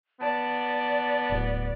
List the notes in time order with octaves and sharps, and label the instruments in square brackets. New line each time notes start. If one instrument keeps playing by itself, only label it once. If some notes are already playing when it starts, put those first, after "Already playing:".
[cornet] B3 [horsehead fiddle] D5 [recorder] A5
[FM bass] D1